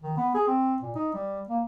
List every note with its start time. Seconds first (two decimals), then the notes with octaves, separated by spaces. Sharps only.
0.03 D#3
0.17 B3
0.34 G#4
0.47 C4
0.82 A#2
0.95 D#4
1.14 G3
1.49 A#3